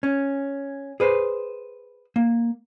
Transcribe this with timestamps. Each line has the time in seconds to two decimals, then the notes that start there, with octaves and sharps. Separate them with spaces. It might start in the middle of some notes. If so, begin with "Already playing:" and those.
0.03 C#4
1.00 G#4 B4 C5
2.16 A#3